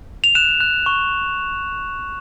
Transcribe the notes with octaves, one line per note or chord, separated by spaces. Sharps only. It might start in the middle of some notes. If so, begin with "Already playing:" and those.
F7
F#6 E7
F#6
C#6